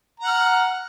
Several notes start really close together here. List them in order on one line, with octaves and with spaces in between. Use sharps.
A#5 F#5 F6